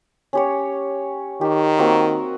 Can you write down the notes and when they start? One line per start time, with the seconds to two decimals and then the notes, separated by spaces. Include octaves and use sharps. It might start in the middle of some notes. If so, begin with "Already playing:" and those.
0.33 C#4 G4 C#5
1.41 D#3 G4
1.78 A#3 C4 F#4